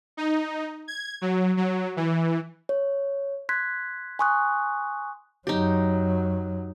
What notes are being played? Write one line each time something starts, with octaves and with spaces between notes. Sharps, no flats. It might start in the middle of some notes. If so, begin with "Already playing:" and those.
D#4
G#6
F#3
F#3
E3
C#5
C6 F#6 G#6 B6
G#5 C6 C#6 D#6 F#6
F#2 F#3 D#4 G4